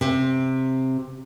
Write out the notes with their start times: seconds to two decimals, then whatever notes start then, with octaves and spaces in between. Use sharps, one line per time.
0.01 C3